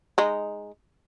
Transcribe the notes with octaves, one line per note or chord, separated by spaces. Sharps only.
G#3 D#4